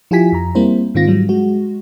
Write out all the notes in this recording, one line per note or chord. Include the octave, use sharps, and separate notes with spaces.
F3 E4 F4 G4 G#5 B6
F2 A#5
G3 A#3 C4 E4 C5
G#2 D#3 C4 F4 A#6
G#2 F#3 G3
G#3 F#4